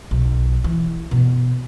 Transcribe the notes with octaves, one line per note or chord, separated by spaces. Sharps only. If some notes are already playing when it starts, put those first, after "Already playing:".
B1
E3
B2